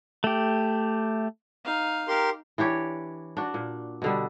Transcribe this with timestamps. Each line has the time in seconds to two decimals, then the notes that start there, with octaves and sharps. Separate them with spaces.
0.24 A3 G4
1.64 D#4 F5
2.08 G4 A#4 C6
2.58 E3 D4 G4 C#5
3.37 D4 F#4
3.54 A#2
4.02 B2 D3 G3